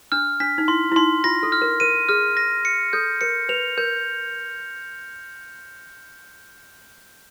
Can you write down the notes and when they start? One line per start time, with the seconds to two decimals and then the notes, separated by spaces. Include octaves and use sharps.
0.12 D4 F6
0.40 D4 B6
0.58 D#4
0.68 E4 C6
0.92 E4
0.96 D#4 C6
1.24 F4 A#6
1.43 A4
1.52 F6
1.62 A#4
1.80 A#4 D#7
2.09 G#4 F6
2.37 A#6
2.65 C#7
2.93 A4 G6
3.21 A#4 C#7
3.49 B4 F7
3.78 A#4 G6